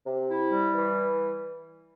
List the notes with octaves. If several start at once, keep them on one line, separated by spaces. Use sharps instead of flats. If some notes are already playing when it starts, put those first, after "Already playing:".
C3
E4
G3
E3